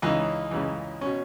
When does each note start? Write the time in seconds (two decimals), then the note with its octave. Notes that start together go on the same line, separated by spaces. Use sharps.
0.02 C#2 C#3 E3 D#4
0.51 C#2 C#3 E3
1.01 B2 C#4